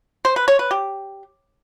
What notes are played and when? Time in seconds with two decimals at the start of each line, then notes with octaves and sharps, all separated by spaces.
0.25 C5
0.36 B4
0.48 C#5
0.59 B4
0.71 G4